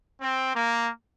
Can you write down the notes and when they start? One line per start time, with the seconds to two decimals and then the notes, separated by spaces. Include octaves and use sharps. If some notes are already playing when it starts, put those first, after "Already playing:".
0.21 C4
0.55 A#3